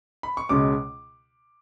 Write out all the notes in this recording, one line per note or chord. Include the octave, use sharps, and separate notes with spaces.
B5
C#6
C#2 B2 G#3 C#4 D6